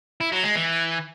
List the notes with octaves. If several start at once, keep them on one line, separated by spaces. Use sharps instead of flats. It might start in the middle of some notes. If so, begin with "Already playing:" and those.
E4
F#3
G#3
E3